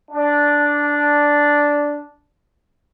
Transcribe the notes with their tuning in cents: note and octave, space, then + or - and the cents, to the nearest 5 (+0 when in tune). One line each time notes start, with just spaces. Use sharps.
D4 -5